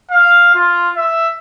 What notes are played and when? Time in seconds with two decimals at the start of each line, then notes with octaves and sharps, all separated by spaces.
0.11 F5
0.55 F4
0.96 E5